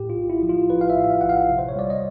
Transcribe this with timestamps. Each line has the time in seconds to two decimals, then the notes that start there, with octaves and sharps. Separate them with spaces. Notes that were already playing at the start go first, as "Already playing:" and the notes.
Already playing: A2 G4
0.10 F4
0.16 A#1
0.30 E4
0.43 F3
0.49 F4
0.69 A#1 B4
0.81 F5
0.90 E5
0.96 A2
1.04 E5
1.10 F5
1.21 A#1 F#5
1.29 F5
1.49 C3
1.58 C5
1.69 C#5
1.76 G3 D5
1.90 D#5